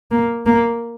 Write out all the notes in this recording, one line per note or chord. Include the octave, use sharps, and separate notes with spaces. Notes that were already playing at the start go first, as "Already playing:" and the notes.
A#3
A#3